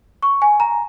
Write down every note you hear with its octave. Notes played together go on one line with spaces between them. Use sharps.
C#6
G#5
A#5